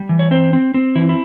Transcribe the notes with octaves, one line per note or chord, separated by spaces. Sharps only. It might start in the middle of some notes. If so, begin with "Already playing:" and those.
Already playing: G3
E3
C#5
C4 C5
C4
C4
E3 E4
E4